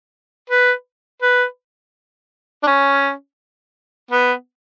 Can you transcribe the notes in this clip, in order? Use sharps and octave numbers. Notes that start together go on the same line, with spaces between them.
B4
B4
D4
C#4
B3